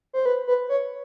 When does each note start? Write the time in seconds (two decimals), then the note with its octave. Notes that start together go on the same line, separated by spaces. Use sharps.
0.13 C5
0.26 B4
0.47 B4
0.69 C#5